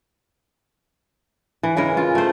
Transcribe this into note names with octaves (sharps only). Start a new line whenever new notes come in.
E3
C#3 E3 G#3 A#4
F4
A3 C5